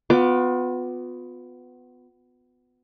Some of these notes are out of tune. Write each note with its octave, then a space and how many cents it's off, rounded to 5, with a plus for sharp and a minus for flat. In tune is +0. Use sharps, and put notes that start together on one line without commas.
B3 +20 F4 +40 D6 +0